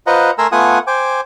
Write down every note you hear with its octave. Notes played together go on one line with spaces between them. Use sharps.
F4 B4 C5 D#5 F#5 A#5
A3 A#4 G#5 A#5 C6 E6
A3 B3 F4 F#5 G#5 D#6
C5 G5 G#5 D6